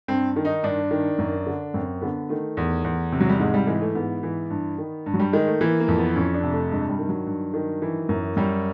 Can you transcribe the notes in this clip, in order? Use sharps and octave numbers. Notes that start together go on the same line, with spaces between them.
G2 C4
D#3
D#4
G2 D4
D#3
F#2
D3
F#2 C4
D3 B3
D#3 A3
E2
E2
C3
F#3
G3
G#2 G#3
G3
E3 G#3
A3
G#2 B3
E3
G2
D#3
G2
F#3
G3
D#3 G#3
A3
E3 A#3
A#3
F2
B3
F2 C#4
D4
C3
A3
G2 G#3
G3
D#3
F#3
G2
D#3
E3
F#2
F#2 G3